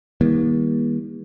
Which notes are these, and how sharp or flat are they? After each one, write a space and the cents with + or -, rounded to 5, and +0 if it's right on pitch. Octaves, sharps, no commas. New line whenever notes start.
D#3 +45 G3 +40 A#3 +45